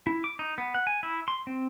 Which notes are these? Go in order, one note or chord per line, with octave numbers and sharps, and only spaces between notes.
E4
D6
D#4
B3
F#5
G#5
E4
C6
C4